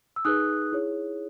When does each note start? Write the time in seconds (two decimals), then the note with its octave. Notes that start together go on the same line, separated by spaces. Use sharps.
0.16 E6
0.25 D#4 G#4 B4 D#6 F#6
0.72 E4 G#4 C#5